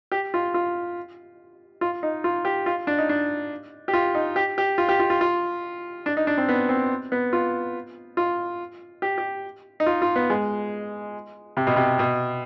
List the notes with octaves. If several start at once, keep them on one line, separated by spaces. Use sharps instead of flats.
G4
F4
F4
F4
D#4
F4
G4
F4
D4
D#4
D4
G4
F4
D#4
G4
G4
F4
G4
F4
F4
F4
D4
D#4
D4
C4
B3
C4
B3
F4
F4
G4
G4
D#4
F4
F4
B3
G#3
C3
B2
C3
B2